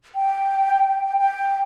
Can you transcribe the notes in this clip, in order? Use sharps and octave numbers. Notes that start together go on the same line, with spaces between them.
G5
G5